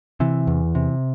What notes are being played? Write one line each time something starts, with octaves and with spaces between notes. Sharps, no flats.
C3 E3
E2
C3